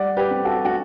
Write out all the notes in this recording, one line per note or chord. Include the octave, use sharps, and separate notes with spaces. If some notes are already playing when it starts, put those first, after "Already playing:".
Already playing: G3 D5 F#5
G4 B4
C4
F#4 A4
F#4